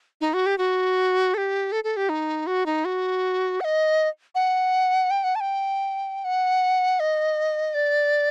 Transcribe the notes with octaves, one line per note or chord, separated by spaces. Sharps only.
D#4
F#4
G4
F#4
A4
G4
A4
A4
G4
D#4
F#4
D#4
F#4
F#5
D#5
F#5
G5
F#5
A5
G5
F#5
D#5
D5